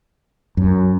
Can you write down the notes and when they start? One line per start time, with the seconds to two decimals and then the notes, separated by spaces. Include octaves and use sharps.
0.57 F#2